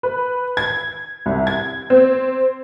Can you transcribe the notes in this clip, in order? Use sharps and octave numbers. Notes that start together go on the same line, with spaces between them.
B4
G#6
C2
G#6
C4